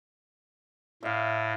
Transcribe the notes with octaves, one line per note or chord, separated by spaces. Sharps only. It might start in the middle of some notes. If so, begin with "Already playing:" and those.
A2 E5 F5